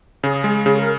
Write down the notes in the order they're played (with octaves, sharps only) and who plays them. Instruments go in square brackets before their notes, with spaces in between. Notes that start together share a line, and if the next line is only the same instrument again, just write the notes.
[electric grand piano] C#3 [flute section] G#4
[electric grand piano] G#3
[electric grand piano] C#3 [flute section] G#4
[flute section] A#4